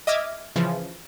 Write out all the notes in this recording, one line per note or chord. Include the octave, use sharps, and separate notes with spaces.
D#5 E5 D6 F6 G#6
C#3 E3 F3